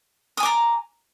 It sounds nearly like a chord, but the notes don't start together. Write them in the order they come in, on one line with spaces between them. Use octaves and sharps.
D#6 G#5 D6 A#5